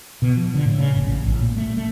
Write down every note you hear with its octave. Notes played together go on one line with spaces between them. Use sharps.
B2
F3
D3
A2
C#3
F#1
A1
A1
A#2
A3
A3